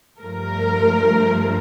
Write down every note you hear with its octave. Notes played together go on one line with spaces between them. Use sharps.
G2 F3 A3 A#4